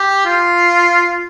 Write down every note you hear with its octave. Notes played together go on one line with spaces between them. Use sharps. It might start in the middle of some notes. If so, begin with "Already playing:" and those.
Already playing: G4
F4